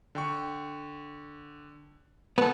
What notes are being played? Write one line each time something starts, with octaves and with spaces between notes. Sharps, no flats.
D3 G5 C#6
B3 A4 B4